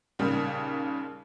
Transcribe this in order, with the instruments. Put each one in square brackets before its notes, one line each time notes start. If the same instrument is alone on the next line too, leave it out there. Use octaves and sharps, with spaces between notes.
[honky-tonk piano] D#2 A#2 C#3 G3